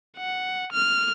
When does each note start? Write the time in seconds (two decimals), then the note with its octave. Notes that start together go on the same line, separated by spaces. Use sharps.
0.17 F#5
0.72 F6